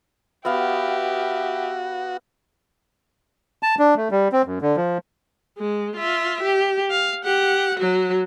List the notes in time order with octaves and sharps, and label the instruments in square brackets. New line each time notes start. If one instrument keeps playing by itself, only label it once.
[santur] B3 F5 [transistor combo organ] F#4 [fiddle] G4 [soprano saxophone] E5
[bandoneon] A5
D4
A3
G3
C4
F#2
D3
F3
[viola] G#3
F4 E5
G4
F5
G4 F#5
F#3 F#4